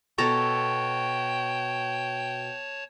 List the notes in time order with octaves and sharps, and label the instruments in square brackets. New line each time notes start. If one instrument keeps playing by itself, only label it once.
[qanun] B2 A4 A#5 [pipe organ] C#5 A5 [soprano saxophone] G5 [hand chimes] C#6